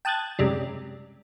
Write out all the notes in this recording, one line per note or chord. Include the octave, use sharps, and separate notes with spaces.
G5 A5 D#6 F#6 G#6 A6
F#2 C3 G3 G#3